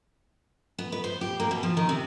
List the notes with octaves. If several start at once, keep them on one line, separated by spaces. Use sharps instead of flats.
B3
B4
C5
G4
A#3
B2
F3
D#3
C3